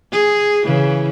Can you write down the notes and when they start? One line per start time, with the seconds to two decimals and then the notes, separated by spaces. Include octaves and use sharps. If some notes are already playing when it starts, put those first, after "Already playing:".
0.12 G#4
0.64 C#3 E3